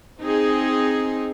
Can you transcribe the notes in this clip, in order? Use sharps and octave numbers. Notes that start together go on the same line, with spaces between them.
C4 D#4 G#4